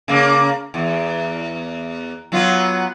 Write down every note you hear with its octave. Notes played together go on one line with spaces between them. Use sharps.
C#3 A#3
E2
F#3 B3 F4